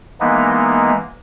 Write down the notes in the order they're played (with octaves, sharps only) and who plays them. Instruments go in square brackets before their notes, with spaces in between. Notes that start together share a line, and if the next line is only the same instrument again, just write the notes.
[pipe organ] E3 G#3 A#3 B3 D#4